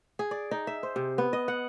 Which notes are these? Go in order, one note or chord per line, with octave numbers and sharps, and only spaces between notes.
G#4
D5
D#4
E5
C5
C3
B3
D#5
F#5